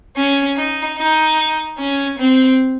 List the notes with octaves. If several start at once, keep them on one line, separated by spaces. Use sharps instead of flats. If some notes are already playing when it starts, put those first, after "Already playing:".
C#4
D#4
D#4
C#4
C4